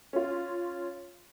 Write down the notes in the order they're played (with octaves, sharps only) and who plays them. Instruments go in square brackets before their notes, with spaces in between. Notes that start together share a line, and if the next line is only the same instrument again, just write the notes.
[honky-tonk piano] C#4 F4